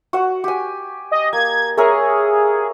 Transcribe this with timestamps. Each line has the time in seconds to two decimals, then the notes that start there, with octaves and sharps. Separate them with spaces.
0.13 F#4 F#5
0.44 G4 G#5
1.12 D#5
1.33 A#3 G#6
1.77 G#4 A#4 C#5 E5